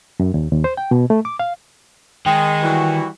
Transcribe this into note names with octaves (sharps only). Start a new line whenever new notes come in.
F#2
D#2
D#2
C5
G5
B2
A3
D6
F5
D#3 G#3 G5
E3 G3 F#4